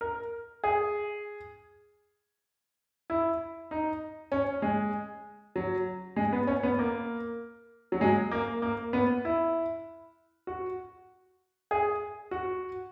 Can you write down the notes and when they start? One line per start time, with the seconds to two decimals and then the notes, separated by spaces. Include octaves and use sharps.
0.01 A#4
0.64 G#4
3.10 E4
3.71 D#4
4.32 C#4
4.62 G#3
5.56 F#3
6.16 G#3
6.33 B3
6.47 C#4
6.63 B3
6.79 A#3
7.92 F#3
8.01 G#3
8.31 A#3
8.62 A#3
8.93 B3
9.25 E4
10.47 F#4
11.71 G#4
12.31 F#4